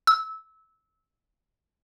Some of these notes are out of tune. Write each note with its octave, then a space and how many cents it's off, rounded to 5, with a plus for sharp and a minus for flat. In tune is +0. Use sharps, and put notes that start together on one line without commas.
E6 -20